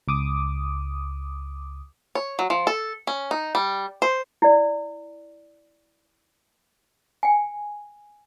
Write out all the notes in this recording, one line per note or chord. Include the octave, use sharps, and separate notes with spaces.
C#2 D6 D#6
C#5
F#3
F3
A4
C#4
D#4
G3
C5
E4 D5
G5 G#5